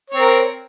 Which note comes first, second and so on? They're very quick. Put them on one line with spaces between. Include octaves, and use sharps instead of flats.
C#5 C4 A#4